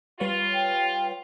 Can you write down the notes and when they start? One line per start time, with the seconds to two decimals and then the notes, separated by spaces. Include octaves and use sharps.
0.20 G3 F4 B4 C#5
0.54 G5